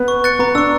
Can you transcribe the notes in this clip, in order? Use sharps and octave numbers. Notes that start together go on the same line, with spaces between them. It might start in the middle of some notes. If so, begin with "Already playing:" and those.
Already playing: B3
C#6
F#6 A6 C#7
B3 A#5
D4 C#6 E6